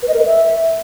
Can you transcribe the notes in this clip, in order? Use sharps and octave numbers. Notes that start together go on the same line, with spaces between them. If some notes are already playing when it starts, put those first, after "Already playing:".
B4
D#5
A#4
B4
E5